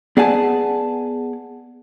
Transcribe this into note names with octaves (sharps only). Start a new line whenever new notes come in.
B3 G#4 D5 F#5 G#5 A5